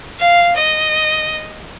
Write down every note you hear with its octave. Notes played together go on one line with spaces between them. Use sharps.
F5
D#5